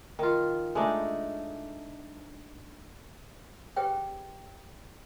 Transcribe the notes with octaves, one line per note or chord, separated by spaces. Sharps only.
D#3 F4
G#3 A3 D4 D#4
G4 G#4 B4 C#5 G5